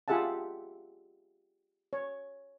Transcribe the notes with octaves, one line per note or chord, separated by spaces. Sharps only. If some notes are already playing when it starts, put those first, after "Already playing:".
F4 G4 G#4 E5 F#5 A5
C#5